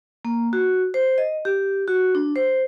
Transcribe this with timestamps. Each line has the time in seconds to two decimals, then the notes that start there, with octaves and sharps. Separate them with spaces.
0.25 A#3
0.53 F#4
0.94 C5
1.18 D#5
1.45 G4
1.88 F#4
2.15 D4
2.36 C5